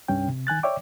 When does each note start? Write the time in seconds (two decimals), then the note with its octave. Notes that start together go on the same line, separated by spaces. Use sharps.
0.08 C2 G2 C#4 G5
0.28 C3
0.47 D#3 G#5 F#6 A6
0.63 C#5 D5 E5 G5 D6